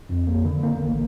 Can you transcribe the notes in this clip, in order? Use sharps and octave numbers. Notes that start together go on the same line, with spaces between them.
F2
A#3
D3
A#3
A1